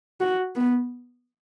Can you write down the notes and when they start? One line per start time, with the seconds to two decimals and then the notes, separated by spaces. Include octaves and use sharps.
0.20 F#4
0.55 B3